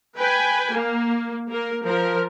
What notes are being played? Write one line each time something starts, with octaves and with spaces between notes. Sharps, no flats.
B4 G5 G#5
A#3
A#3 A#4
F3 A#4